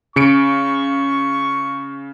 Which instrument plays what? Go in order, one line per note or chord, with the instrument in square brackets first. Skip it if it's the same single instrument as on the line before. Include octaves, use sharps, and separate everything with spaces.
[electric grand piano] C#3 C#7 D7 [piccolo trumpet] C#6